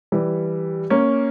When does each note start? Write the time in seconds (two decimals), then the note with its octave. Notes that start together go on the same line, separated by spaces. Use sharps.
0.12 E3 G3
0.90 A#3 C#4